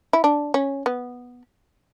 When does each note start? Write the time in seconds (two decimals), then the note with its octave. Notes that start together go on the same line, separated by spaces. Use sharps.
0.13 E4
0.24 D4
0.54 C#4
0.86 B3